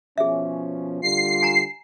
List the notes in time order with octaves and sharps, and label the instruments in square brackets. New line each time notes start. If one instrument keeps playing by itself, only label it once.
[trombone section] B2 F3 C#4 [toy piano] G#4 E5
[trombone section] D3 G3 F4 [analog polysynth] C7
[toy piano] G#5 A#5